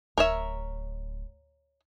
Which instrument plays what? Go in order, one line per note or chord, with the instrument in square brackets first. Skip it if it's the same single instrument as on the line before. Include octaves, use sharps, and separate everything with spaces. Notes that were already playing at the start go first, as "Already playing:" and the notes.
[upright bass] D1 [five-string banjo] A#4 C#5 E5